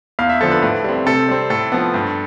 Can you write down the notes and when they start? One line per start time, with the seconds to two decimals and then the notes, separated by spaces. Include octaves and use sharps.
0.19 E2 F5
0.29 E5
0.41 D3 F3 A4
0.51 B4
0.63 A2
0.84 G3 C4
1.06 C3 A4
1.28 G3 C4
1.50 A2 A4
1.72 F3 B3
1.94 G2